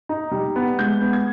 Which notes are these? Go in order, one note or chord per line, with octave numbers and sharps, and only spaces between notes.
D#4
G3
B3
G#3 G6
B3
G#6